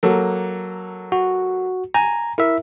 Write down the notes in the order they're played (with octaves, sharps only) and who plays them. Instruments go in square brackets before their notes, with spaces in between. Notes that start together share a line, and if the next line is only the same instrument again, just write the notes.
[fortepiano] F#3 A#3 A4
[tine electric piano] F#4
[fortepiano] G#5 [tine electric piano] A#5
[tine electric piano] E4 E5 [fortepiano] A#4